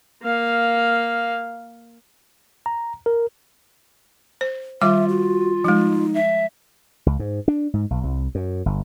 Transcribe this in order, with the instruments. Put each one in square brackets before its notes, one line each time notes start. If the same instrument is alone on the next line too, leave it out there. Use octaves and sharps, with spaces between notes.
[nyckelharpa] A#3 F5
[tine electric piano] A#5
A#4
[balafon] C5
[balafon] D#3 G3 D6 [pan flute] F4 [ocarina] E5
[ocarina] F#4
[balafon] F3 G#3 [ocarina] D#4
[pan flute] E5
[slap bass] C#2
G#2
D4
G#2
B1
C2
F#2
G1